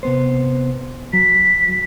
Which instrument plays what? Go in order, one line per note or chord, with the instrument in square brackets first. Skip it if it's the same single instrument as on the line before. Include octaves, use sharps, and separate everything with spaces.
[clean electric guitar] C3 B3 C5
[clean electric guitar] F#3 [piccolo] B6